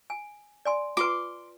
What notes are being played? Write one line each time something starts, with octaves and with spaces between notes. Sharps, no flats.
G#5
D5 G#5 C6
F4 B4 C6 D6